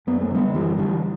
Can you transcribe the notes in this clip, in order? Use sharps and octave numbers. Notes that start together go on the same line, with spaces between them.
F#2 B3
A3
D3 G3 B3
F#2 E3 G3
D3 E3 G3